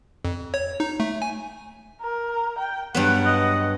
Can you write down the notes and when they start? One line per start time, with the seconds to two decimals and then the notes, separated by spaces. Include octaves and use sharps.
0.25 F2
0.54 C#5
0.80 D#4
1.00 A3
1.22 G#5
2.01 A#4
2.59 G5
2.95 G2 F#3 B3 F#5
3.26 D#5